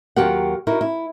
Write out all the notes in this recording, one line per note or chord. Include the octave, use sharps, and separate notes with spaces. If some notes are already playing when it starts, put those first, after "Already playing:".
D#2 F#3 F4 G4 A#4 F#5
D#4 E4 F#4 A#4
E4